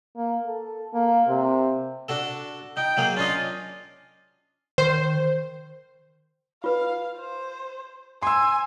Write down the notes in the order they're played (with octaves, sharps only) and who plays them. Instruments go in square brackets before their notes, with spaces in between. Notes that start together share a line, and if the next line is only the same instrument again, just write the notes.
[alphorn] A#3
A4
A#3
C3
[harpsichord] D4 F#4 A4
[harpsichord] D#4 [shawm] G5
[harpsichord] F#3 A#3 G#4
[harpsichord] C#4 D4 D#5 [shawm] F4
[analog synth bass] D#3 [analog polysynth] C5
[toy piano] F4 B4 [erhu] F5
[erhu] C5
[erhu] G#5 [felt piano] C6 E6